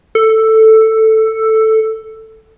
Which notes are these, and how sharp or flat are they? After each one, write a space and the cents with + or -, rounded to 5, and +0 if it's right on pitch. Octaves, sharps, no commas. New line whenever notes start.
A4 +5